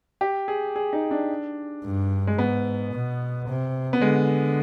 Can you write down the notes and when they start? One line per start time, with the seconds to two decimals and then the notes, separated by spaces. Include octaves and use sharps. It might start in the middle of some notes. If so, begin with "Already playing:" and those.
0.21 G4
0.48 G#4
0.76 G#4
0.93 D#4
1.11 D4
1.84 G2
2.27 G#3
2.38 G#2 B3
2.93 B2
3.48 C3
3.93 B3
4.01 D3 G#3